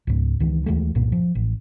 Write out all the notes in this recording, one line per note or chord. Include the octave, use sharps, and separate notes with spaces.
C#2 G#2
C#2 D#3 E3
D#2 E3 G#3 A3
C2 G2 A#2 A#3
F3
A1